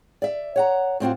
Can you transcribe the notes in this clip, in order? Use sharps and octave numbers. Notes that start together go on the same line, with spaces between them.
D5 E5
C#5 F#5 A#5
A2 C4 F4 F#4